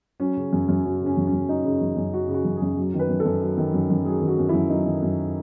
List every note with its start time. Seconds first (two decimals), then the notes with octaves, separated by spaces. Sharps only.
0.20 F#3 C#4
0.37 C#3
0.53 F#2
0.69 F#2
0.85 F#3 C#4
1.01 C#3
1.06 C#4
1.17 F#2
1.27 C#4
1.33 F#2
1.48 F#3 D#4
1.64 C#3
1.81 F#2
1.97 F#2
2.13 F#3 F#4
2.28 C#3
2.34 F#4
2.45 F#2
2.56 G#4
2.62 F#2
2.77 F#3
2.94 D#3
2.99 B4
3.09 F#2
3.20 A4
3.25 F#2
3.42 F#3
3.58 D#3
3.74 F#2
3.90 F#2
4.05 F#3 G#4
4.22 D#3
4.28 F#4
4.39 F#2
4.49 F#2 E4
4.70 F#3 D#4
4.86 D#3
5.02 F#2